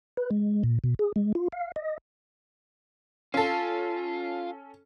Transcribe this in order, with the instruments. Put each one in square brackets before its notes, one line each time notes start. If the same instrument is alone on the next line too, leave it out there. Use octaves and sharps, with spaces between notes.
[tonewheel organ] B4
G#3
A#2
B2
G#4
G#3
F4
F5
D#5
[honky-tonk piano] C#4 A4 [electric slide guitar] F4